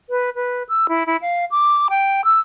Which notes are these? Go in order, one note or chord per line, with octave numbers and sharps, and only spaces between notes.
B4
B4
E6
E4
E4
F5
D6
G5
E6